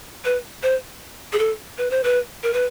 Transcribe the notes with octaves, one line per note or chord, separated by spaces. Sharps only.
B4
C5
G#4
A4
B4
C5
B4
A#4
B4